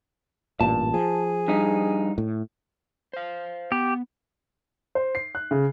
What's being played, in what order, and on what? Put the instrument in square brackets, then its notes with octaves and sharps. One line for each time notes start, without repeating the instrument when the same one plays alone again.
[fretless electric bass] A1 G2 A#2 [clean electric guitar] A5
[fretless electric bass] F3 [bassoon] G#4
[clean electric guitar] G2 D#4
[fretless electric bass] A2
[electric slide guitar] C5 F5
[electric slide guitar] B3 [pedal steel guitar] G4
[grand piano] C5
C7
F#6
C#3